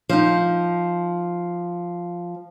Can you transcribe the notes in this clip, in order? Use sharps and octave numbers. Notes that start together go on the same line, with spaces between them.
F3 D#4